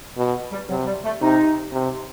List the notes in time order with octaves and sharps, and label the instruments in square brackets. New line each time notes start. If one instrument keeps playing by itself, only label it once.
[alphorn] B2
[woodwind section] G3
[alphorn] C3 [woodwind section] F#3
[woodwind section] G3
A3
[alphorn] C3 [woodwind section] D#4
[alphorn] C3